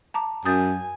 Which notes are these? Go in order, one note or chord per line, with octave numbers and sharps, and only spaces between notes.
A5 A#5 D6
F#2 G#5 D#6 G6 A6